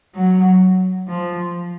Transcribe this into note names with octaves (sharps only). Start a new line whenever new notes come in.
F#3
F3